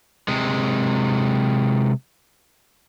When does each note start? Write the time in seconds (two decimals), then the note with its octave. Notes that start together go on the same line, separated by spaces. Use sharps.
0.28 C3 G#3